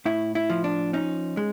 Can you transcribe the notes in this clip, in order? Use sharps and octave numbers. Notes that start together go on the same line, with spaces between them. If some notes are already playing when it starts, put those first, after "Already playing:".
A2 E4
E4
F3
D4
C#4 D#4
G#3